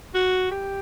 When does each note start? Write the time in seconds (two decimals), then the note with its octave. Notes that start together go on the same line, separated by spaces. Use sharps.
0.15 F#4
0.51 G4